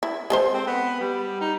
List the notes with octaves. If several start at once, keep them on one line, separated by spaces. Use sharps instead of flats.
E4
G#3 A4 C5
C4
B3
G3
D#4